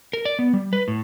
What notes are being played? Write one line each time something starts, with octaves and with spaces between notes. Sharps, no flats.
A#4
D5
B3
G3
B4
A2